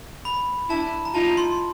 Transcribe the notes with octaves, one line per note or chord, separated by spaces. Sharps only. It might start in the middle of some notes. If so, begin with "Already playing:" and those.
B5
D4 E4 A5
A#5
D#4 F4 A5
C6